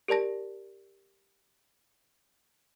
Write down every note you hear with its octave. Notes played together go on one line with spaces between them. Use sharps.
G4 A#4 D5 A5 A#6